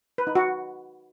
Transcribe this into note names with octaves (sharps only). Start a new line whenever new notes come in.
B4
D#4
F#4